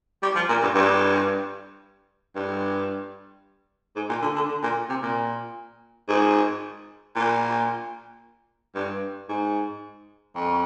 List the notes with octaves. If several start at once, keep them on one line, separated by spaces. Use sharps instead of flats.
G3
F3
A#2
G2
G2
G2
G#2
A#2
D3
D3
D3
A#2
C3
A#2
G#2
A#2
G2
G#2
F2